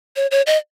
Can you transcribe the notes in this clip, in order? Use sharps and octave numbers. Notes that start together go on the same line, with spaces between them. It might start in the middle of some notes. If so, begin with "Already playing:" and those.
C#5
C#5
D#5